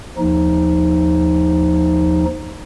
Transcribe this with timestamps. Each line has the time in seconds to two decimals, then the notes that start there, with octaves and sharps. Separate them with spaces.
0.18 D#2 F3 D#4